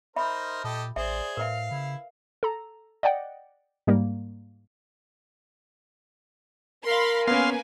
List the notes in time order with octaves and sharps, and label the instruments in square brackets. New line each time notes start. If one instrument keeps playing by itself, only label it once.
[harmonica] D#4 A#4 C5 [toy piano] E5 B5
[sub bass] A#2 [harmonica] G4 A4 D#5
[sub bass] A1 [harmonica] G#4 [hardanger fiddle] C5 D5 [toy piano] E5
[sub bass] A2 [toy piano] A#4 B4 E5 [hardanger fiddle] F5
[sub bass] C#3 [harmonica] E4
[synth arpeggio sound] A4 A#5
D5 D#5 F#5 G5
G#2 G3 A#3
[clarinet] A#4 [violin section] F5 B5 C6
[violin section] A#3 B4 G#5 [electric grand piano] B3 C#4 [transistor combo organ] F5 C6